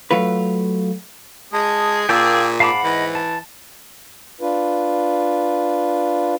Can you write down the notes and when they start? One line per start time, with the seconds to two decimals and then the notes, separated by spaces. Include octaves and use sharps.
0.11 F#3 A3 F4 B4
1.53 G#3 G#4 A5 D#6
2.09 A#2 A#3 F5 G5 A5 D6 E6
2.60 G#2 F5 F#5 A5 B5 D6
2.84 E3 D#5
3.15 A5
4.41 D4 F4 B4